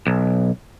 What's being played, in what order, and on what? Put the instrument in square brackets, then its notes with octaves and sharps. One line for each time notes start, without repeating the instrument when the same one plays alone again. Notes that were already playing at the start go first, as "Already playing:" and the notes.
[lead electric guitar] B1